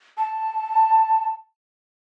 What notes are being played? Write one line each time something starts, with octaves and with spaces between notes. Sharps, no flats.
A5